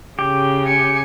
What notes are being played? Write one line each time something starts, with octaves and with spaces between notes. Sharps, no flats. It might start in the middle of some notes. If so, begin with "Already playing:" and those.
C#3 G4
G#5 C#7